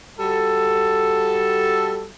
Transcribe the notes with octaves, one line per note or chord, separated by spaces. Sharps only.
G3 F#4 A4